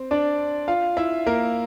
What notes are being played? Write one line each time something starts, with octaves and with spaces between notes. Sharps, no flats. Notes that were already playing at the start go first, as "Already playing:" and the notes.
Already playing: C4
D4 D5
F4 F5
E4 E5
A#3 A#4